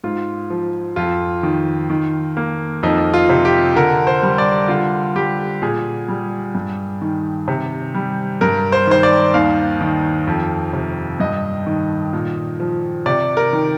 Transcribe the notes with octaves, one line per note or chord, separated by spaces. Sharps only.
G#2 F4
F3
F2 F4
D#3
D#3
A#3
F2 D#4
F4
C3
G4
D3 A#4
C5
G3
D5
D3 F4
G3 G4
A#2 G#4
G3
G2
D#3
C3
G3
G2 A#4
C5
D#3 C5
D5
D#2 F5
D#3
F2
C3
G2 D#5
D#3
A#2
F3
C3 D5
A#4
D#3